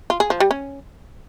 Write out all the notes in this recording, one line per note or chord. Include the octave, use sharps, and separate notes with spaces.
F4
G#4
F3
G3
C#4